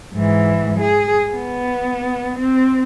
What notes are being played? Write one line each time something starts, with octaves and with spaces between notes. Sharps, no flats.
G#2 E3
G#4
B3
C4